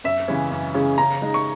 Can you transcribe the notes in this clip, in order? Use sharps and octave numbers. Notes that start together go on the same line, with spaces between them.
F#2 E5
C#3 E3 G#3 C#4
F#2
C#3 E3 G#3 C#4
C#3 A#5
G#3 D#4
C#6